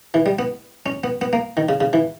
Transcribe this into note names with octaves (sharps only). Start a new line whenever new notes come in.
E3
G3
B3
C#4
B3
B3
A#3
D#3
C#3
C#3
E3